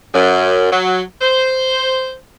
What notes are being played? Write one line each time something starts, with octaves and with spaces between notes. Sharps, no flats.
F#2
F#3
C5